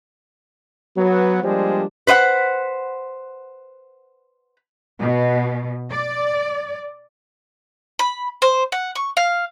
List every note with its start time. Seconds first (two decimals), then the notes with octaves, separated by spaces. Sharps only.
0.96 F#3 B3
1.43 F3 G3 G#3 A#3 D4 C5
2.07 B4 C5 D#5 F#5
5.00 B2
5.92 D5
7.99 B5
8.42 C5
8.72 F#5
8.95 C#6
9.17 F5